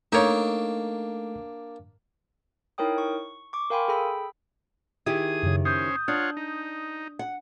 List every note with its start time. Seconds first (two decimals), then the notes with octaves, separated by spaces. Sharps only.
0.12 A3 A#3 D4 D#4 A4 C#5
2.78 D#4 E4 A#4 C#5 G5 D#6
2.98 C#6
3.53 C#6 D6
3.70 A#4 F5 G5 G#5 B5 C6
3.88 G#4 A4 G5 B5 E6
5.06 D#3 E4 G4 G#4 D#6
5.43 F#2 C#3
5.65 C#4 C5 D#6 G6
6.08 D4 F4 C#5 F#5
6.37 D#4
7.19 F#5